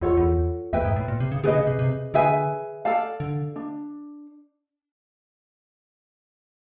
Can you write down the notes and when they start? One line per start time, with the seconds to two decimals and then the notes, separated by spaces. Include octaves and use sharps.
0.01 E2 F4 A4 C#5 F#5
0.17 E2
0.73 E2 B4 E5 G5
0.85 G#2
0.96 A2
1.08 A#2
1.20 C3
1.32 C#3
1.44 D3 G#4 B4 D#5
1.55 C#3
1.67 C3
1.79 C3
2.14 D3 G#4 B4 E5 G#5
2.85 A4 D5 F5 A5
3.20 D3
3.56 D4